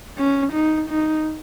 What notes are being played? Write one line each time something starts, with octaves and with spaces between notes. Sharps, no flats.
C#4
D#4
D#4